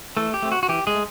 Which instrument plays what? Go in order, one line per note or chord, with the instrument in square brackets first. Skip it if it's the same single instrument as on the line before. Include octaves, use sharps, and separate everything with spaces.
[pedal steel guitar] E3 A3 A4
G4
A3 C4
F#4
F#4
E3 G4
G#3 G#4
A3